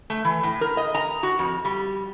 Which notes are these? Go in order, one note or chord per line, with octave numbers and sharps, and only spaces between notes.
A3
E3
A2
A#4
D#5
A#5
F#4
F2
G3